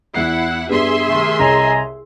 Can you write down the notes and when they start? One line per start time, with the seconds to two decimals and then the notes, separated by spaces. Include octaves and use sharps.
0.14 E2 E4 F#5 C7
0.69 G2 G3 B3 G#4 E5 C6
1.09 C3 D#3 A3
1.39 C2 C#5 D#5 G#5 A#5